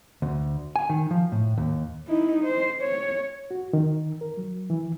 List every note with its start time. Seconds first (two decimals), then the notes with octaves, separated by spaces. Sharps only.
0.22 D2
0.76 G#5
0.90 D#3
1.11 F3
1.32 A2
1.58 D#2
2.08 D#4 E4
2.44 C5
2.82 C#5
3.51 F#4
3.73 D#3
4.21 A#4
4.37 F#3
4.70 E3